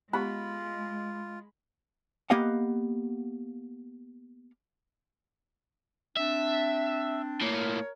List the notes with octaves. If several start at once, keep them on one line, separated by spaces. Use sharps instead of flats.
G#3 B3 F4 G4 B5
A#3 B3 G4 D#5 F5 F#5
C4 D4 E5
A2 A#3 A#4 C#5